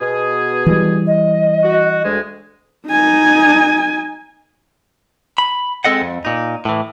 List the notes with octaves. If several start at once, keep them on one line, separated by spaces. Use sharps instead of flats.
B2 G#4
E3 G3
D#5
F#4
D2 G#3
D#4 G#5
B5
G#3 C4 A4 D#5 F#5
F2
A#2 D#4
A2 E3